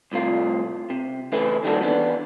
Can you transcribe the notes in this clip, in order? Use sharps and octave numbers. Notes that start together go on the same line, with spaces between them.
C2 A2 C3 F4
C3
C#3 E3 A3 E4 B4
D#3 G3 A#3 F4 F#4 A4
E3 B3 D4